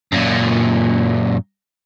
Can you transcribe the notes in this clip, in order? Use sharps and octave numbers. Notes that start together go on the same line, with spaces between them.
F#2 A#2